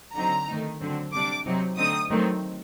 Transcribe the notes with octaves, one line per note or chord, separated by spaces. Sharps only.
D3 F#3 C4 D#4 A#5
D#3 A3 D#4
D3 F#3 C4
C3 G3 D4 D6
C3 F#3 C4 D#4
D3 A3 C4 D#4 D#6
D#3 F#3 A3 C4 D#4